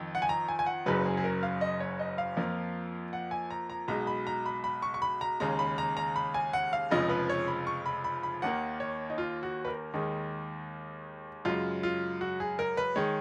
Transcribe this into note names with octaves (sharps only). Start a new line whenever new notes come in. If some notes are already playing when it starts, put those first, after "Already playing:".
Already playing: F2 D#3
F#5
G#5
A#5
G#5
G#5
F#5
F#1 F#2 C#3 F#3 B4
G#4
G#4
A#4
F5
D#5
C#5
D#5
F5
F2 F3 A#3
F#5
G#5
A#5
A#5
B1 B2 G#3 A#5
B5
A#5
B5
B5
C#6
C#6
B5
A#5
D#2 C#3 G#3 A#5
B5
A#5
A#5
B5
G#5
F#5
F5
F1 F2 C#3 F3 G#3 D#5
B4
C#5
B5
C#6
B5
B5
B5
D#2 D#3 A#3 F#5
C#5
D#4
F4
F#4
B4
A#4
D#2 D#3 G#3
F#2 C#3 G#3 F4
F4
F#4
G#4
A#4
B4
D#3 G#3 C#5